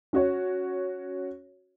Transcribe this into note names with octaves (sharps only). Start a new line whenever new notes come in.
C#4 F#4 C#5